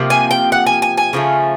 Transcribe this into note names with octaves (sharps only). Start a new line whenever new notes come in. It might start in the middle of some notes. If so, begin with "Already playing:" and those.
Already playing: C3 F3 A#3
G#5
G5
F#5
G#5
G#5
G#5
C#3 F3 A3